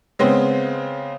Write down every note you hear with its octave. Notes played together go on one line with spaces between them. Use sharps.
C#3 G#3 B3 C4